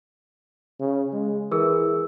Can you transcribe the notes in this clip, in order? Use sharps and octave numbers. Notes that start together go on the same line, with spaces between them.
C#3
G#3
E3 G#4 A#4 E6